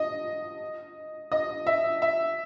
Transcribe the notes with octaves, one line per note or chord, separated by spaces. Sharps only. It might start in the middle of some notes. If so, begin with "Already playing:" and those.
Already playing: D#5
D#5
E5
E5